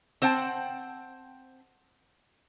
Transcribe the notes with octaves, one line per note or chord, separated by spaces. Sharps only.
C4 C5 F#5 G5 A5